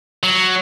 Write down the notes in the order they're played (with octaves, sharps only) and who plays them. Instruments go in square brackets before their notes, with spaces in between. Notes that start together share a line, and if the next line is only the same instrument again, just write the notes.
[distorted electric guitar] F#3